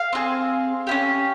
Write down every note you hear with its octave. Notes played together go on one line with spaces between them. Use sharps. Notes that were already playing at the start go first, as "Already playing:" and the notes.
Already playing: F5
C4 F4 G#4
C#4 E4 G4